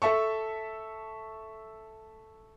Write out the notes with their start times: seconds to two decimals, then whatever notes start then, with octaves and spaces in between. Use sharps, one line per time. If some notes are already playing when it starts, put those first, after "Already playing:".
0.02 A4 E5 A5 C#6